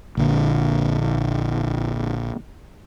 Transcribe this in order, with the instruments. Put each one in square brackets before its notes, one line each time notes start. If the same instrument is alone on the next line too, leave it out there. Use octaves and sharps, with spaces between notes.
[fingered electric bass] A#1 D3